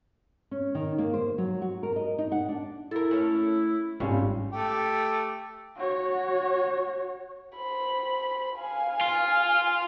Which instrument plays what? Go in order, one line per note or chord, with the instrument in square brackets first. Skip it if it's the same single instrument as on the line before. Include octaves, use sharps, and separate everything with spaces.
[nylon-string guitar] C#4
D#3
A#3
C5
F#3
F#4
A#4
D#5
D#4
F#5
D4
[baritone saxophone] E4 [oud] A4 A#4
[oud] A3 C#4
[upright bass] G#1 [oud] A2 C#3 [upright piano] G3 C#4 F4
[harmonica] A3 G4
[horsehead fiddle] F#4 C#5
[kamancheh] C5 B5
F5 G#5
[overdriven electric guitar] F4